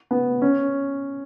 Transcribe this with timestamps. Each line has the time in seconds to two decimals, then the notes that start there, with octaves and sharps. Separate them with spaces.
0.11 B3
0.42 C#4